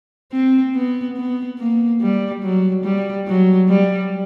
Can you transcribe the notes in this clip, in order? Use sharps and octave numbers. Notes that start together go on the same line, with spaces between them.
C4
B3
B3
A#3
G3
F#3
G3
F#3
G3